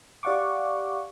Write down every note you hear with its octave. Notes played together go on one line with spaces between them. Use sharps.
G4 D5 F5 F#5 C#6 D6